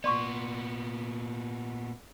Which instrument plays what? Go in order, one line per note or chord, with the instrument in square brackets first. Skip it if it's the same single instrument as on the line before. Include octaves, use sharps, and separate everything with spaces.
[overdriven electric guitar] A#2 B3 [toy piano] D5 C6 C#6